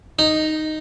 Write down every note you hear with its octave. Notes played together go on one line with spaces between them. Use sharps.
D#4